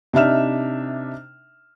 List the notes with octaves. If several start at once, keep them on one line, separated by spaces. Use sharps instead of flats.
C3 D4 D#4 E5 F6 E7